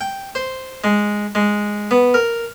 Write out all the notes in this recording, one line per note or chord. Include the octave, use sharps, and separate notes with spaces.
G5
C5
G#3
G#3
B3
A#4